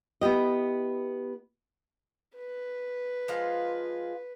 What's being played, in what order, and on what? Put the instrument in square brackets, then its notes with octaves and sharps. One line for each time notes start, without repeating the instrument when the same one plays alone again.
[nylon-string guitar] B3 E4 G4 D#5
[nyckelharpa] B4
[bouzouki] F3 G#3 F4